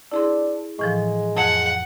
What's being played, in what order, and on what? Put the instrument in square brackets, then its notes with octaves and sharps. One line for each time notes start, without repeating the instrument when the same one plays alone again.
[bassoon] D4 [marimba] E4 G#4 C6
[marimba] A2 E3 F3 [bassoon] G#3
[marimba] F2 [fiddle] F#5